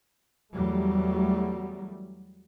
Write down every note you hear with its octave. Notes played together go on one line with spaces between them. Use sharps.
E2 F#3 G3 A3